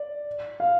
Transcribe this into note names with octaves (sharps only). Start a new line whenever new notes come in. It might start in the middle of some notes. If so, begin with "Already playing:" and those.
Already playing: D5
F5